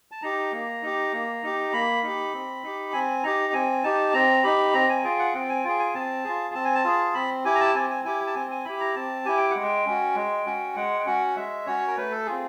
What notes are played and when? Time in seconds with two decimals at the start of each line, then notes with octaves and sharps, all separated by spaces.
0.11 A5
0.22 D#4 G4 A#5
0.52 A#3
0.82 D#4 G4
1.13 A#3
1.43 D#4 G4
1.73 A#3 B5
2.03 D#4 G4
2.33 C4
2.63 D#4 G4
2.93 C4 G#5
3.23 D#4 G4 A#5
3.53 C4 G#5
3.83 D#4 G4 A5
4.14 C4 A#5
4.43 D#4 G4 B5
4.74 C4 A#5
4.89 G#5
5.04 F4 G#4 G5
5.19 F#5
5.34 C4 G5
5.49 G#5
5.64 F4 G#4 G5
5.79 G#5
5.94 C4 A5
6.24 F4 G#4
6.55 C4 A5
6.65 G#5
6.75 A5
6.84 F4 G#4
7.14 C4 B5
7.45 E4 G4 G#5
7.55 A#5
7.60 A5
7.75 C4 G#5
7.90 G#5
8.05 E4 G4 G#5
8.27 A5
8.35 C4 G#5
8.51 G#5
8.65 E4 G4 B5
8.80 A#5
8.96 C4 A5
9.25 E4 G4 G#5
9.38 G5
9.51 G#3 F#5
9.63 G5
9.86 C#4 F#4
10.15 G#3
10.46 C#4 F#4
10.76 G#3 F#5
11.00 G5
11.06 C#4 F#4 F#5
11.36 G#3 E5
11.66 C#4 F#4 C#5
11.87 A#4
11.97 A3 B4
12.11 A4
12.26 C4 F4 G#4